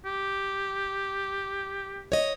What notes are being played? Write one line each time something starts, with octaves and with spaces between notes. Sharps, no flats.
G4
C#5 D#5